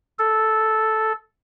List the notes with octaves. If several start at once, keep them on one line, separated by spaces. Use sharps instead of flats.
A4